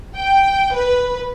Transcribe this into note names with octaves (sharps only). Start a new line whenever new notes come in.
G5
B4